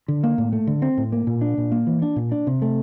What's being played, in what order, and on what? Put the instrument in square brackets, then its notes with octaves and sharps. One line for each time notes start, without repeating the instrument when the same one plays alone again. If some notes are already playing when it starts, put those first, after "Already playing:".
[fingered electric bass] D3
A#3
A2
A3
D3
C4
A2
A#3
A#2
D4
A#2
A#3
E3
D4
A#2
D4
C3
A3